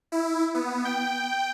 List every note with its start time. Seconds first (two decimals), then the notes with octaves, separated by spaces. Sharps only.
0.12 E4
0.54 B3
0.85 G5